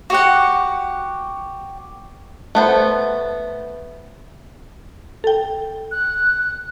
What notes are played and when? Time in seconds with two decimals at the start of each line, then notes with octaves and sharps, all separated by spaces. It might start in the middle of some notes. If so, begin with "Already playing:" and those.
0.10 F#4 G4 F#5
2.55 A3 B3 C5
5.24 A4 G5
5.91 F#6